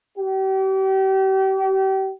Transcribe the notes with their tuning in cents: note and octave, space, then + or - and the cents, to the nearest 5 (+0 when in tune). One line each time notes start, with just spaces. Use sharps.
G4 -35